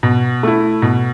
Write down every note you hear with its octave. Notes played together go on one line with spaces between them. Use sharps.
B2
A3 E4
B2